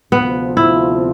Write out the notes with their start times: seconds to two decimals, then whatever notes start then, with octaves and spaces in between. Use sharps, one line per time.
0.12 D2 C3 F3 B3 C4 F4
0.57 E4